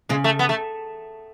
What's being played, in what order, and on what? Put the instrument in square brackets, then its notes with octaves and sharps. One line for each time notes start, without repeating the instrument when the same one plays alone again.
[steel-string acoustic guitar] C#3 [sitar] G#3
[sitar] A3
B3
A3